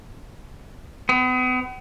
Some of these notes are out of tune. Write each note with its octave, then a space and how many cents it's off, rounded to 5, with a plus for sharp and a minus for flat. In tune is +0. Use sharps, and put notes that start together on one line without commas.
B3 +40